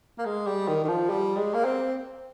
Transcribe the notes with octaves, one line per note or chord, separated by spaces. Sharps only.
A#3
G#3
G3
D#3
D#3
F3
G3
G#3
A#3
C4